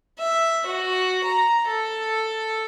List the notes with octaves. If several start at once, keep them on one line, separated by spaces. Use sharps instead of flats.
E5
F#4
A#5
A4